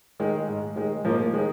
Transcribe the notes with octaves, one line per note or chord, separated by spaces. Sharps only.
D#3 G#3
G#2
D#3 G#3
G#2 F3 A#3
D#3 G#3